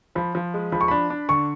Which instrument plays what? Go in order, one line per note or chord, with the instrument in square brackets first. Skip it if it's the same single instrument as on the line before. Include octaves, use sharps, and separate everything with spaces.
[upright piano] F3 [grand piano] B5
[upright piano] F3
G#3
[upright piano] F3 [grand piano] B5
[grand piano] C#6
[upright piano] D4 [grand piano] B5
[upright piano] D4
[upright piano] D3 [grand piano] C#6